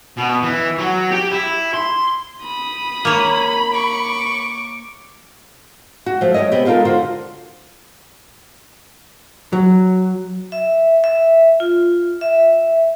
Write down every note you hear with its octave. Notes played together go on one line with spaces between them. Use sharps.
B2
E3
F#3 F#4
G4 G5
E4
C6
B5 D#6
A#3 C#5
C#6 D6
F#4
F3 A3
G3 F#4 G#4 C#5 D#5
C3 B3 G4
G#3 D#4 F4 G4 A4 A#4
D3 F4 F#4 C5
F#3
E5
E5
F4
E5